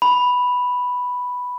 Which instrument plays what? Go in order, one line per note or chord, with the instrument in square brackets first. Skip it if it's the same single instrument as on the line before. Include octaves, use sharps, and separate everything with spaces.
[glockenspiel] B5